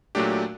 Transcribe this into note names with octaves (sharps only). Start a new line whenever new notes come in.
A#2 F#3 A3 D4 G4